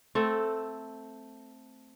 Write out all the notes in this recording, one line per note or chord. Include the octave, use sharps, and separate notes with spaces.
A3 C4 A4